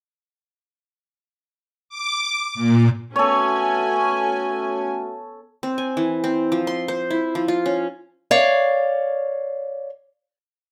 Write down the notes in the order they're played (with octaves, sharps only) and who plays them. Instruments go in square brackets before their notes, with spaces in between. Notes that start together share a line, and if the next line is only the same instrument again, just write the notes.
[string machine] D6
A#2
[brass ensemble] A3 F#4 [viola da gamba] B3 [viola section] C#4 G#5 [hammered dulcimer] A4 C#5
[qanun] C4
G#5
E3
C4
F3
C6
C5
E4
F3
F4
C#4
[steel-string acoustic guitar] C#5 D5 F5